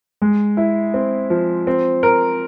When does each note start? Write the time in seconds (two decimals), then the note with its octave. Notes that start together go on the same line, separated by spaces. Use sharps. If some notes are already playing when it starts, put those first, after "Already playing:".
0.22 G#3
0.57 E4
0.94 C4
1.30 F3
1.67 C4
2.03 A#4